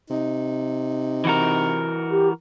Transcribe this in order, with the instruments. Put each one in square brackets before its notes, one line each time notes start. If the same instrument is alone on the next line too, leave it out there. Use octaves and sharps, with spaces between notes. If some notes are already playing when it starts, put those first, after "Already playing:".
[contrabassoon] C3 [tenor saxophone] D#4
[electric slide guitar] E3 F#4 A#4
[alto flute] G4